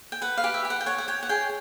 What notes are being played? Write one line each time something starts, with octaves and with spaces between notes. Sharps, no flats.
G5
B4 F#5
F5
G4
E5
G4
F#5
G5
C#5 F#5
F#5
C#5 G5
F#5
G#4 G5